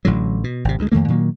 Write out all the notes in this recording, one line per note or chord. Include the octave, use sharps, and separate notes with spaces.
A1 A2 D3 F#3
B2
G#1 C3
D2 C3 G#3
F2 D#3 A3 A#3
A#2 D#3 F#3 A#3